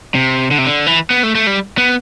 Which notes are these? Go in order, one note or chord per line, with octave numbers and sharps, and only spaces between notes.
C3
D3
C3
D3
E3
B3
A3
A3
G3
B3